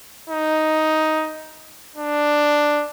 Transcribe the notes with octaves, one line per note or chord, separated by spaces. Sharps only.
D#4
D4